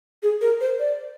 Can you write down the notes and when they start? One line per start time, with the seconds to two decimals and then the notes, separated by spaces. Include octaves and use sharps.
0.23 G#4
0.41 A#4
0.61 C5
0.80 D5